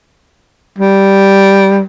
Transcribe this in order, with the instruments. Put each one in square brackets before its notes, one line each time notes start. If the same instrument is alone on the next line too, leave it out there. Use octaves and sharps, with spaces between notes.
[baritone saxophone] G3